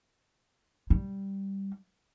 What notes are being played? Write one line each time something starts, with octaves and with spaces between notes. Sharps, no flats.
G3